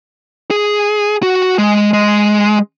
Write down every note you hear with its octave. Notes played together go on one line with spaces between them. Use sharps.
G#4
F#4
G#3
G#3